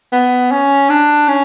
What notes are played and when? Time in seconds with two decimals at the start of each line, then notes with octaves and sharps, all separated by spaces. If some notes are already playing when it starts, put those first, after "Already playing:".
0.13 B3
0.51 C#4
0.90 D4
1.29 C#4